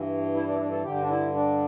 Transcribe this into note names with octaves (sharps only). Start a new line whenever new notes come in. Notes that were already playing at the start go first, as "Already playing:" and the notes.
Already playing: G2 E3
E4
D4
E4
D4
A4
G2 D3 G4
D4
E4
D4